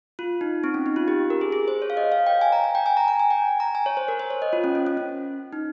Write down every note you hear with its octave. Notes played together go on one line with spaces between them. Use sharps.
F4
D#4
C4
C#4
D#4
F4
G4
A#4
G#4
G#4
C5
C#5
F5
D#5
F5
G5
G#5
A#5
G#5
G5
G#5
A#5
A#5
G#5
G5
A#5
G#5
C#5
C5
A#4
C5
C#5
D#5
F4
C#4
C#4
C#4
C#4
D#4